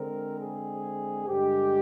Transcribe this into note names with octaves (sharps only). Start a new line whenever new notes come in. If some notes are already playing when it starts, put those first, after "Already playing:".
Already playing: D3 G#3 C4 A#4
G#4
G2 D3 G#3 G4